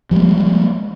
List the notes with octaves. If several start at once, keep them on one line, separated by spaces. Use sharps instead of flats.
F3 G3 G#3 A#3